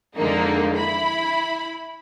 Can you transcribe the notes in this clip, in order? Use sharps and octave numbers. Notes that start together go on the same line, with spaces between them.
F2 D3 D#3 G#3 A#3 D#4
E4 B5